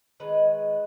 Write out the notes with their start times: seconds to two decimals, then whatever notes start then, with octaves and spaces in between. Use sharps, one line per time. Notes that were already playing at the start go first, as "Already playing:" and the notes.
0.20 D#3 G#3 B4